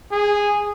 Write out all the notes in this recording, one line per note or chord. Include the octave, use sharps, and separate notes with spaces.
G#4